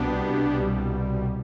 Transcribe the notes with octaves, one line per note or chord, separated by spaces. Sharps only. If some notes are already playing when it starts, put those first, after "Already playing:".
Already playing: C2 B2 B3 D4 G4
C2 B2 G3